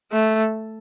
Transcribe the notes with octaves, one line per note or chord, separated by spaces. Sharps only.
A3